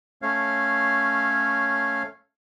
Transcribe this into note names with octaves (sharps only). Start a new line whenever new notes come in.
A3 C#4 C#5 F5